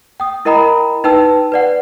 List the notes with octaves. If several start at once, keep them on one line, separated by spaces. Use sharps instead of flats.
G5 D#6
E4 A#4 D#5 G5 A#5 B5
D#4 B4 G5 A5 E6
B4 D5 F#5